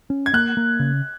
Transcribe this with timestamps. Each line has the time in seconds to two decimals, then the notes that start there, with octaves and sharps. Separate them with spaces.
0.10 C#4
0.26 G#6
0.34 A#3 F#6
0.57 A#3
0.80 C#3